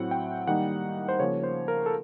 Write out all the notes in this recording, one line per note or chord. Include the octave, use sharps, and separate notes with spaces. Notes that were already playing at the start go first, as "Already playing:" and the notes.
Already playing: A2 F#3 A3 C4 E4 F#5
G5
D#3 G3 A#3 D#4 F#5
C5
C#3 F3 A#3 C#5
C5
A#4
A4